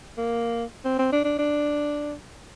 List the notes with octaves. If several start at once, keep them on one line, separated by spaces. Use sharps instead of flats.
A#3
C4
C4
D4
D4
D4